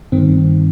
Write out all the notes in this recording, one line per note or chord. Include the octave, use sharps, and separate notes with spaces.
G2 D#3 C4